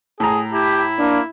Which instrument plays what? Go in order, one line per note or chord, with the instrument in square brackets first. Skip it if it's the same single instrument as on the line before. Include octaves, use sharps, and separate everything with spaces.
[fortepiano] A2 A#5 [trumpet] G#4
[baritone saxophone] E4 [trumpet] G4
[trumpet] A#3 [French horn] D4